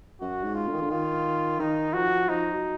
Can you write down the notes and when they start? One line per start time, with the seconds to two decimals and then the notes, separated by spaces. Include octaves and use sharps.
0.20 F#2 F#4
0.43 G#2
0.55 F4
0.68 D3
0.74 D#3
0.82 D3
0.91 D#3 F4
1.59 D#3 D#4
1.94 F3 F#4
2.29 F3 D#4
2.52 F#3